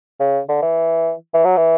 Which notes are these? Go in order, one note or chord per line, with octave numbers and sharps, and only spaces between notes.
C#3
D3
E3
E3
F#3
E3